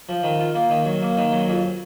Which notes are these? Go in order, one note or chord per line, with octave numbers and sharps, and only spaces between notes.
F3
D#3
F4
A#3
D#3
F#3
A#3
D#3
F#3
F2